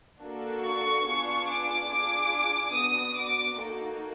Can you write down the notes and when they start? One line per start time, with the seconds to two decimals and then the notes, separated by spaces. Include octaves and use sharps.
0.21 A#3 D4 F#4 A4
0.63 C#6
1.05 B3 D4 F4 G#4
1.48 D6
1.90 D4 F4 G#4 D6
2.75 B3 D4 F#4 D#6
3.18 D6
3.60 A#3 D#4 F#4 A4